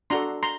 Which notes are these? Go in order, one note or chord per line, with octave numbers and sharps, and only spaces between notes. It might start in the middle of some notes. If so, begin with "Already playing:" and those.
D4 F#4 A4 A#5 C6
A#5 C6